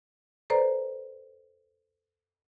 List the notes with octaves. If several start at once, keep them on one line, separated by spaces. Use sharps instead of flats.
A4 B4 C5 D5 A#5